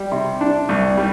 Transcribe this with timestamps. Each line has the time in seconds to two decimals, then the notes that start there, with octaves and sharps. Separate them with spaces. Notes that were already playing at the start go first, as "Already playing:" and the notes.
Already playing: G3
0.12 C3
0.41 D4
0.69 C2
0.97 G3